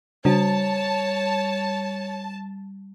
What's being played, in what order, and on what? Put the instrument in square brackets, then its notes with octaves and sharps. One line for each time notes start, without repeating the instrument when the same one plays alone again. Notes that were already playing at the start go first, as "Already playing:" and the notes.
[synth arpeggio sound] C#3 D4 F#4 [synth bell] G3 [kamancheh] C#5 [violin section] A5